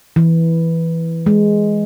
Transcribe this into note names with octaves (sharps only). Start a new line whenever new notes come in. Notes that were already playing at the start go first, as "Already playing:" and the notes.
E3
G#3